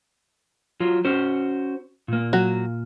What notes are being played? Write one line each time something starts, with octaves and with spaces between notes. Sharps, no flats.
F#3 F4
C#4 F#4 C5
A#2 A#3
F#3 F#4